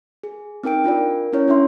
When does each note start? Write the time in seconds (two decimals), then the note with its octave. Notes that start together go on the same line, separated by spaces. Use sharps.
0.23 G#4
0.63 C4 D#4 A#4 G5 D7
0.84 D4 F4 A#4 D5
1.33 C#4 E4 C#5
1.48 C#4 D4 E4 E5 C6